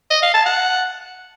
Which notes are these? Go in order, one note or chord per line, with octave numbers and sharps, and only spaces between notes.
D#5
F5
A5
F#5